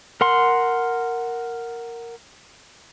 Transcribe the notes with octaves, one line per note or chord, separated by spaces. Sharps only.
A#4 F#5 C6